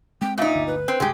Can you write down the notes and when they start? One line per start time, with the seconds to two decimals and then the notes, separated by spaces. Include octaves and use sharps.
0.21 G#3 C4 G5
0.38 A#2 D#4 E5
0.55 G1 D2
0.67 B4
0.88 C4
1.00 F#1 C2 G#3 G4